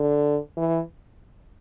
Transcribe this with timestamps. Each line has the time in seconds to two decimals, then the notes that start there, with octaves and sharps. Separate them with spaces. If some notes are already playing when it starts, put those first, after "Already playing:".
Already playing: D3
0.57 E3